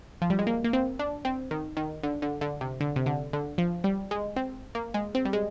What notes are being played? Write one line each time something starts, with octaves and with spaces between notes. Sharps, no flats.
F3
G3
G#3
A#3
A#3
C4
D4
C4
D#3
D#3
D3
D3
D3
C3
D3
C3
D3
D3
F3
G3
G#3
C4
A#3
G#3
C4
G3
G#3